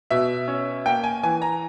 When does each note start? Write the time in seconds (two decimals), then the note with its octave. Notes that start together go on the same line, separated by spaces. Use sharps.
0.11 B2 E5
0.48 C#4
0.86 A#3 G5
1.04 G#5
1.23 E3 G#5
1.42 A#5